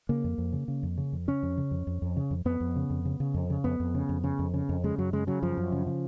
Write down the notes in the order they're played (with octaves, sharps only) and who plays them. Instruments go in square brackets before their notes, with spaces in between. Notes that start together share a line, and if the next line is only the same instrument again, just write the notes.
[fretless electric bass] C#3 A#3
F2
F2
C#3
C#3
F2
C#3
F2
C#3 C#4
F2
C#3
F2
F2
F2
C#3
F2
F2 B3
F2
C#3
F2
C#3
C#3
F2
C#3
F2 B3
F2
C#3
F2
C#3
F2
C#3
F2
C#3 G#3
F#2 F#3
C#3 G#3
C#3 F#3
F#2 F3
F#2
C#3
C#3